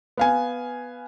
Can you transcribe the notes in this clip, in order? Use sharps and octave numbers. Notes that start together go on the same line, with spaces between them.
B3 F5 G#5